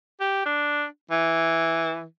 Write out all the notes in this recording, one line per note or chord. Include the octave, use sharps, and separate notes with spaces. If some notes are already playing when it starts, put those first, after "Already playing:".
G4
D4
E3